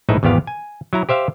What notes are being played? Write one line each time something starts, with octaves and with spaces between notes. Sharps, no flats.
A#1 A2 G#3 D#4 B4 E5
G#1 E2 B3 G4 F5
G#5
F#3 E4 A#5
G4 C5 E5 F5